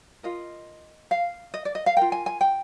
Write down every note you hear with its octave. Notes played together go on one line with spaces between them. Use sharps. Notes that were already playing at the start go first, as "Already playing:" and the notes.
F4 A#4 D#5
F5
D#5
D5
D#5
F5
F4 A#4 G5
G#5
G#5
G5